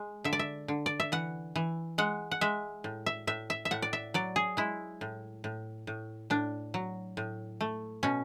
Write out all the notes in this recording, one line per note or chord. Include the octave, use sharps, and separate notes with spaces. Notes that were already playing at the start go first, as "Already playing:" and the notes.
Already playing: G#3
D3 E5
D5
E5
D3
D5
E5
E3 F#5
E3
G#3 F#5
F#5
G#3 E5
A2
E5
A2 E5
E5
E5
A2 F#5
D5
E5
F#3 D5
G#4
G#3 E4
A2
A2
A2
A2 D4
F#3
A2
A3
B2 C#4